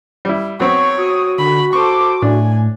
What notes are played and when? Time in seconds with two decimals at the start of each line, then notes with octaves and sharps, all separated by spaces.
0.25 G3 E4
0.60 F#3 B3 C4 C#5 C#6
0.97 F#4 D#6
1.38 D3 B5
1.73 A4 C5 C#6 D6
2.22 A2 D4 G#5